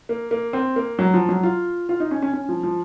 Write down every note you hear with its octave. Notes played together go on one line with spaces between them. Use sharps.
A#3
A#3
C4
A#3
F#3
F3
F#3
F4
F4
D#4
C#4
C#4
C#4
F3
F3